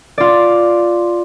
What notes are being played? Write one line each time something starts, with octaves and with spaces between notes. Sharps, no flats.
F4 D5